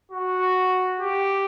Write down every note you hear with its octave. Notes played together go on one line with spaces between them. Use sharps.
F#4
G4